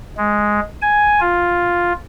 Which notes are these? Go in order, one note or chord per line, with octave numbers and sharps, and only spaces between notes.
G#3
G#5
F4